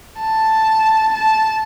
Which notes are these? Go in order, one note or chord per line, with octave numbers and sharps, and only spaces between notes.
A5
A5